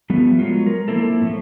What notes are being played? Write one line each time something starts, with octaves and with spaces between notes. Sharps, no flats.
F3 G3 A3 B3
F#3 G#3 B3 F4
A#4
F3 A#3 C4 E4 A4
A2 A3